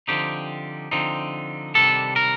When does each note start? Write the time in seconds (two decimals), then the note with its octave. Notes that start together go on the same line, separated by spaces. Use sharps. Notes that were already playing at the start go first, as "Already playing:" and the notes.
0.08 D3 F3 C4 D#4 G4
0.91 D3 F3 C4 D#4
1.75 C3 D#3 G3 D4 A4
2.16 A#4